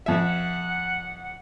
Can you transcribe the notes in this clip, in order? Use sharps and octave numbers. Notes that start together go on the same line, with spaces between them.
F2 E5 F#5